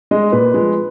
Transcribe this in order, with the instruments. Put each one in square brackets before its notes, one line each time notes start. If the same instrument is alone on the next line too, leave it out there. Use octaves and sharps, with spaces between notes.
[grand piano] G#3 D#5
A#2 B4
F3 G#3